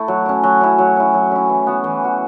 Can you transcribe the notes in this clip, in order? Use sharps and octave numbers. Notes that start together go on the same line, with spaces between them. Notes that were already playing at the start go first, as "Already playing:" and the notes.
Already playing: A3 E4
F#3
C#4 E4
F#3
C#4 E4
F#3
C#4 E4
F#3
C#4 E4
E3
B3 F#4
E3
B3 F#4